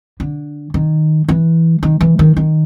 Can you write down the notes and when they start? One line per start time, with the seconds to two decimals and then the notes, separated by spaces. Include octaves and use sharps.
0.20 D3
0.74 D#3
1.28 E3
1.83 D#3
2.01 E3
2.19 D#3
2.37 D#3